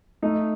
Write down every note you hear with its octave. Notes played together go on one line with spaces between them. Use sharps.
A3 D#4